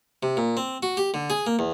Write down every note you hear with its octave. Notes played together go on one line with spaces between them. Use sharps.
C3
A#2
C4
F#4
G4
D3
G#4
A#3
E2